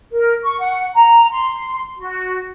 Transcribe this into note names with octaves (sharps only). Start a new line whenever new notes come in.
A#4
C#6
F#5
A#5
C6
F#4